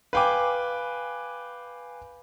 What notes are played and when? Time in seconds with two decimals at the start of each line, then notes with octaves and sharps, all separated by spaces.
0.13 B4 F5 G5 G#5 D6